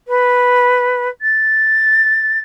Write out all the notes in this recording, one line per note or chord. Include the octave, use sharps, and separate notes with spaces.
B4
A6